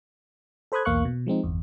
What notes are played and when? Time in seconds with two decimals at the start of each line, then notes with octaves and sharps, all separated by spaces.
0.72 A4 C5 B5 D#6 F#6 G#6
0.85 B1 E2 A#3 F5 C#6 F#6
1.05 B2
1.26 F3 G#3 C4 D#4
1.43 G1 E2